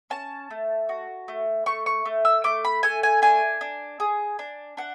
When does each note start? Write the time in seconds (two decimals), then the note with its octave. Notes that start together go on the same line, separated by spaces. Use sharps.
0.10 C#4 A5
0.50 A3
0.89 F#4
1.28 A3
1.66 A3 C#6
1.86 C#6
2.05 A3
2.25 E6
2.44 A3 D6
2.65 B5
2.83 A3 G#5
3.03 G#5
3.22 D4 G#5
3.61 D4
4.00 G#4
4.39 D4
4.77 D4 F#5